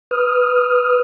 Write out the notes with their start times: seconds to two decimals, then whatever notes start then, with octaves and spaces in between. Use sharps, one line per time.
0.11 B4 D#6 F6